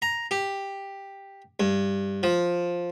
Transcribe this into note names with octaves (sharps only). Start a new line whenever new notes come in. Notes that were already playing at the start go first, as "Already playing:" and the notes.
A#5
G4
G2
F3